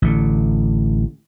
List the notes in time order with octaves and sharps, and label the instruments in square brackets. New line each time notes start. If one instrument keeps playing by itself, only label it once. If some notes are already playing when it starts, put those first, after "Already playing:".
[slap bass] A1 D3